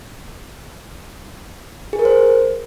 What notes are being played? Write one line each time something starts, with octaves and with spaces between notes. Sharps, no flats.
G#4
A#4
C5